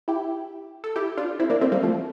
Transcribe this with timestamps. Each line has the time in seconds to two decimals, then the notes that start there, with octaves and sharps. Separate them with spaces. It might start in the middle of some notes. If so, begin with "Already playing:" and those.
0.08 E4 G4
0.84 A4
0.96 E4 G4
1.17 D4 F4
1.39 C4 E4
1.50 A#3 D4
1.61 A3 C4
1.72 G3 A#3
1.83 F3 A3